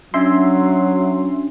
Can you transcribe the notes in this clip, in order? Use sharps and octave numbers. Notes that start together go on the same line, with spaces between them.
F#3 C#4 D4 E5 C6